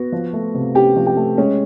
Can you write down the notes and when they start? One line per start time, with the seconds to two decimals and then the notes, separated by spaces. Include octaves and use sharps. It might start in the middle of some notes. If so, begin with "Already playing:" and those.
Already playing: B3 F#4
0.12 F3
0.33 A3
0.54 C3
0.75 C#4 G4 G5
0.96 F3
1.06 G4 G5
1.17 A3
1.38 G#3 C#4 C#5